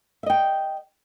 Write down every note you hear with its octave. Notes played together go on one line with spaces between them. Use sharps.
D#5 E5 G5